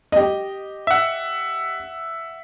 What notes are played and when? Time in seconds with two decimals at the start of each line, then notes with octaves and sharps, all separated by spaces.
0.12 G4 D#5
0.87 E5 F#5